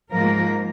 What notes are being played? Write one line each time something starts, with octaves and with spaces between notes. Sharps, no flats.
G#2 F3 A#3 A#4